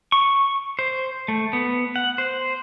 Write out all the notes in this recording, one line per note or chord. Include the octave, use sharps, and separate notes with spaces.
C#6
C5
A3
B3
F#5
C5